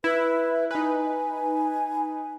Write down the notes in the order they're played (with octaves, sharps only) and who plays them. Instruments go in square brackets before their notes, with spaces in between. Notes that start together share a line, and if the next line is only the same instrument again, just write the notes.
[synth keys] E4 [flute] B4
[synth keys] D#4 B4 [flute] G#5